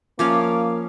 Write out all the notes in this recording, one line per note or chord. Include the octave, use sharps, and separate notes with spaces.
F3 A#3 C#4 F5 D6